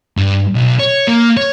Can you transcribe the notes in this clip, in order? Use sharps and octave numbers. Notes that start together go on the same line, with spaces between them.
G2
B1
C#5
A#3
C#5